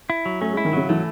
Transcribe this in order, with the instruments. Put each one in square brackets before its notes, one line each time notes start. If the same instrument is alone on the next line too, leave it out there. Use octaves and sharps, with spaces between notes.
[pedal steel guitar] E4
F#3
[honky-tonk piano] A3 [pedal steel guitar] C#4
[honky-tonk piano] G#3 [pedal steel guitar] E4
[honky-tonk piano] D#3
[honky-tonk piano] C#3 [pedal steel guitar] F#3
[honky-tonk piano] E3 [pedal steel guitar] A3